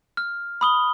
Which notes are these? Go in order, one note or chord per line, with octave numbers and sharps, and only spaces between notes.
F6
B5 D#6 G7